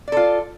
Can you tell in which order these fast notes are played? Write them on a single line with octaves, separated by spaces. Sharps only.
D5 A4 F4